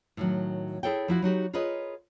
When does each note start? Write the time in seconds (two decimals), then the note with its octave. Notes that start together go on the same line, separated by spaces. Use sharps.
0.17 A2 D#3 F#3
0.83 E4 G#4 A4 C#5 G5
1.08 F3 E4 F#4
1.22 F#3 D#4 F#4 G4
1.53 F4 G#4 A#4 B4 C#5 D#5